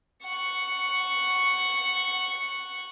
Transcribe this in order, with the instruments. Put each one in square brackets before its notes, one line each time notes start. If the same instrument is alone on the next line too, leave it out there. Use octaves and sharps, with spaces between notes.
[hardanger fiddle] F#5 C#6